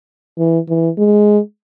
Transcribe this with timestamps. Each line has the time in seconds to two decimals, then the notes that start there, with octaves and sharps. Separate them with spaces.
0.38 E3
0.69 E3
0.98 G#3